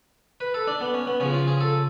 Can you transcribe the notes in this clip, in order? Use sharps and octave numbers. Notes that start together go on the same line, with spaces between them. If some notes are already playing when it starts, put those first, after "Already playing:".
B4
A4
D4
B3
C#4
B3
C#3 F3 C#4
F4
G#4
A4